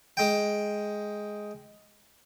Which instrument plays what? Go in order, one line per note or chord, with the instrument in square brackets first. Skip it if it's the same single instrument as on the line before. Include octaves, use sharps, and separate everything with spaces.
[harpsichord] G#3 G5